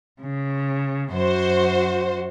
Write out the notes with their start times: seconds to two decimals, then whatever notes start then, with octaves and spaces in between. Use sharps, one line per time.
0.22 C#3
1.14 F#2 F#4 C5